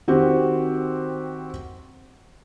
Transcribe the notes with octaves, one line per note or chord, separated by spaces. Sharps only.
D#3 C4 F#4 G4